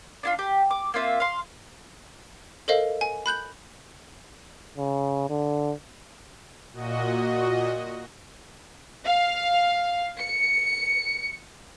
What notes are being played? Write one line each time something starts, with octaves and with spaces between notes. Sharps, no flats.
D4 E4 F4
G4
D6
A#3 C4 F4 E5
F5 C6
A4 A#4 C5 D#5 F5
G#5
B5 F#6 G6 F#7
C#3
D3
A#2 F#4 D#5
F5
C#7